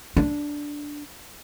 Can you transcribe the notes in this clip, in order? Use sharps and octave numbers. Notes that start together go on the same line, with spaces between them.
D4